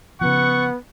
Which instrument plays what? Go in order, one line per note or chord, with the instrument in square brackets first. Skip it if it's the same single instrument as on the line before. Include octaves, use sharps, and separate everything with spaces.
[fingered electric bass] C#3 F3 [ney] B3 [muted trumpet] F#5 [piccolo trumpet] C#6